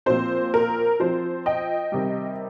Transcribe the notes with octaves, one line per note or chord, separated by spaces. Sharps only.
A#2 F3 C4 C5
A#4
F3 C4 C5
D#5 G5
C3 D#3 G3